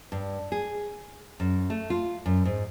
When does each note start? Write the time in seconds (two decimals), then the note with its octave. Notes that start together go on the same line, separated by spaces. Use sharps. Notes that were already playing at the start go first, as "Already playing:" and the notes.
0.12 G2
0.52 G#4
1.40 F#2
1.70 A3
1.90 F4
2.26 F#2
2.45 G#2